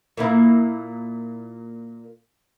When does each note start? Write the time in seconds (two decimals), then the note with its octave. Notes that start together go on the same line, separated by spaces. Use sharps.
0.17 A#2 A#3 E4